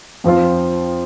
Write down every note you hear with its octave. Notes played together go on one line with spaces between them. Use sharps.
F2 F3 C4 F4